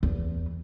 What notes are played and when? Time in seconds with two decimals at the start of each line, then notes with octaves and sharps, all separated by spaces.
0.03 E2